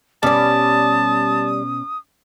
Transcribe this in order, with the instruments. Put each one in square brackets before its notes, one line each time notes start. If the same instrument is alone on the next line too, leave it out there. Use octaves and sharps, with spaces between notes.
[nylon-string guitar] B2 C#4 G#5 [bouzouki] G3 D5 [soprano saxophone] A5 [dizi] D#6